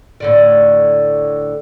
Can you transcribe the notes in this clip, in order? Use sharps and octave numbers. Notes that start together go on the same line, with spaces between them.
A2 D3 D5